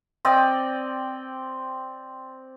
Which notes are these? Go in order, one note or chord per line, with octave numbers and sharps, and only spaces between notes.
C4 D5 D#5 G5